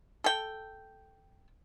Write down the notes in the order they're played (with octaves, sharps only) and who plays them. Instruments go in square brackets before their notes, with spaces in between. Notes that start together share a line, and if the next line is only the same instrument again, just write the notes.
[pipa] A4 G5